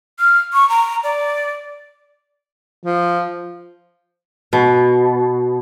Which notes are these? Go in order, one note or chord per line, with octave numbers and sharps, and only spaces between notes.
F6
C#6
A#5
D5
F3
B2